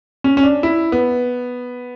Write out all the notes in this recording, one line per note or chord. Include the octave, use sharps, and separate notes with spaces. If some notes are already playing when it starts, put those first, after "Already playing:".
C#4
C#4
D4
E4
B3